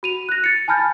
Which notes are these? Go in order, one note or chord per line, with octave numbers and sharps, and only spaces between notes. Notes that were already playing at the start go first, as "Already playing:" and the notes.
F#4 D#7 F7
F#6 A#6
A6 C#7
G#5 A5 B5 F6 G6 A6